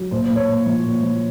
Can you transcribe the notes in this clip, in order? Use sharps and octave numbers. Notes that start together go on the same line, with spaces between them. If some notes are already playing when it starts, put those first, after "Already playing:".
Already playing: F#3
A#2 C5
C5
A#2
C#5
A#2
F3
A#2
F3